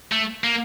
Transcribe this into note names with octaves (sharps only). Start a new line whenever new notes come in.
A3
A#3